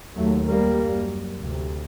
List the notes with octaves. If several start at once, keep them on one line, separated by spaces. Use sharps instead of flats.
D#2 F#3 A3
G3 A#3
F#2
D2 C3